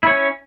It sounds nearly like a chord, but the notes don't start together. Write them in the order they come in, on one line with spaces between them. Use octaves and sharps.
E4 C#5 C#4